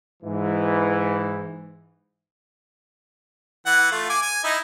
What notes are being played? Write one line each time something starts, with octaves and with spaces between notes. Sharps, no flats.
G#2 E3
E3 F#5
A3 F4
G#5 D6
G#5
D#4 E4 D#5